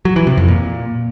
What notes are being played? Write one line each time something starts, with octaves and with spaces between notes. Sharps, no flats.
F#3
E3
C3
F2
A#2